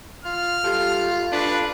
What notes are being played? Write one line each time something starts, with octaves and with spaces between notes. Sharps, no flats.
F4 F6
G3 F4 G4 A4
D4 F4 A4 B4 F5